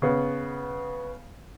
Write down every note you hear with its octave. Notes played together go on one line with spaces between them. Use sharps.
C#3 B3